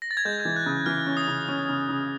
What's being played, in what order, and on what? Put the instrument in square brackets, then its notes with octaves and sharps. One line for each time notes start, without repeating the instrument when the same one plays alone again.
[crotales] A#6
A6
G#6
[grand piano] G#3 [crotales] G6
[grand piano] E3
[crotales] F#6
[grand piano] C#3
[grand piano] E3 [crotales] F6
[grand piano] C#4
[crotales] D#6
[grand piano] C#3
C#4
C#3
C#3